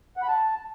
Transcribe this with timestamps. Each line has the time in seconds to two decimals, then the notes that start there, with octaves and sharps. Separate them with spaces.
0.17 F#5
0.22 B5
0.28 A5